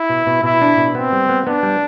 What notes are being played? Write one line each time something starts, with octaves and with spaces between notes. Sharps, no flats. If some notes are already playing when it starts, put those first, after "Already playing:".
Already playing: E4
B2
B2
B2 E4
D4
B2
B3 C4
G3
B3
B3 D4
G3